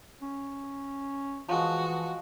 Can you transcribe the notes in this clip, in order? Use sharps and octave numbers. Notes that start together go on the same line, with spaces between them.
C#4
E3 F3 G#3 F#4